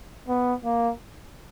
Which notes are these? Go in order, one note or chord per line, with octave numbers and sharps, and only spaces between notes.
B3
A#3